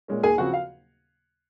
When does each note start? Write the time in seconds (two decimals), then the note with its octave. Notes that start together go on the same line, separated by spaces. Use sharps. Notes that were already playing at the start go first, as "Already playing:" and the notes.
0.08 A#2 G#3 C#4
0.23 D#2 G#4 G#5
0.38 C#3 F3 C4 F#4 F#5
0.53 F5